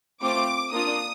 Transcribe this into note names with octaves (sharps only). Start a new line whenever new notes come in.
A3 C4 F4 D6
A#3 D4 F4 D#6